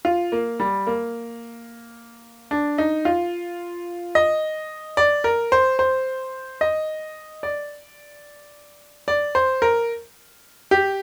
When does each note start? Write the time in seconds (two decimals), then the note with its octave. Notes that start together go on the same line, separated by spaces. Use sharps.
0.05 F4
0.32 A#3
0.60 G3
0.87 A#3
2.51 D4
2.78 D#4
3.05 F4
4.15 D#5
4.97 D5
5.24 A#4
5.52 C5
5.79 C5
6.61 D#5
7.43 D5
9.08 D5
9.35 C5
9.62 A#4
10.71 G4